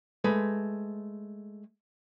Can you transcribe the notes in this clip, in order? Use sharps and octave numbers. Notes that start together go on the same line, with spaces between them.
G#3 A3 B4